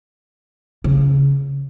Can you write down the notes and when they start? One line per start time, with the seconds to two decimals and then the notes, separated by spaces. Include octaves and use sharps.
0.84 C#3